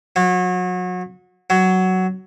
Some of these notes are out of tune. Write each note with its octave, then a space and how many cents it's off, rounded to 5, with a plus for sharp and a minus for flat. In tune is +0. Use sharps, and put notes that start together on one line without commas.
F#3 -30
F#3 +10